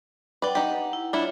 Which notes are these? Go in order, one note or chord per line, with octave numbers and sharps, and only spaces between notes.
B4 D5 F#5 G5 D6
D#4 G4 F#5
E4
D4 E4 F4 C#5 E5